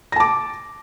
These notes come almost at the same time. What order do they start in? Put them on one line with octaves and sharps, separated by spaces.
A#6 A5 D6